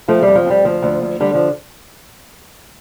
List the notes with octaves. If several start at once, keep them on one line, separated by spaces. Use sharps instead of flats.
F2 F3 A3
F2 G3
F3
F2 G3
D2 F3
D2
D2
D3 G3
F3